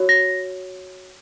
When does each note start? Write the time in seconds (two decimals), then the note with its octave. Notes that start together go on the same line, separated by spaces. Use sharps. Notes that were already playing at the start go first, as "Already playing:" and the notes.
Already playing: F#4 C#5
0.09 A#6